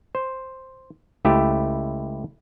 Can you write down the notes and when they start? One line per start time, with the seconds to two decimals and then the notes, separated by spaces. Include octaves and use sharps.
0.15 C5
1.25 C#2 A3 E4 G4